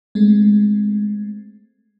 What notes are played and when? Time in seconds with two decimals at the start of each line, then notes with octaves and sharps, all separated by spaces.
0.15 G#3 A3 C4